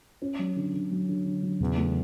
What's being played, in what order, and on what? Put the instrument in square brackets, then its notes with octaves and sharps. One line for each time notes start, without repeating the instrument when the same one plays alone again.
[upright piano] C#4
F#3
D3
D3
F#3
D3
D3
F#3
[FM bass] E2 [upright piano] C#3
[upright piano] A3